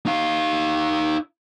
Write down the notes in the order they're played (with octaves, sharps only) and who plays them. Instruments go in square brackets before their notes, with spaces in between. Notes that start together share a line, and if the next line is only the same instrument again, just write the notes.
[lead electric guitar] D#4 F5